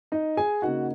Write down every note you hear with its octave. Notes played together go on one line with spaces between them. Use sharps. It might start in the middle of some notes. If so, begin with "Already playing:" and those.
D#4 D#5
G#4 G#5
C#3 A#3 D#4 F#4 F#5